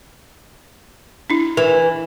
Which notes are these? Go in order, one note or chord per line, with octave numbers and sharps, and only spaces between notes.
D4 E4
E3 A#4